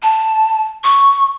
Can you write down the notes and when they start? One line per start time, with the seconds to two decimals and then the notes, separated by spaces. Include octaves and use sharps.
0.02 A5
0.84 C#6